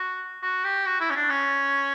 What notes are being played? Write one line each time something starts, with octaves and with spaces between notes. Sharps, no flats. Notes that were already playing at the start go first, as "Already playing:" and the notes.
Already playing: F#4
F#4
G4
F#4
E4
C#4
D4
C#4